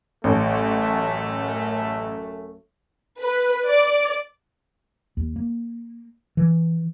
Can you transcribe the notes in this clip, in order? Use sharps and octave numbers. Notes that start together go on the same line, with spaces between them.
A1 F#2 A3 C#4 A4
B4
D5
D#2
A#3
E3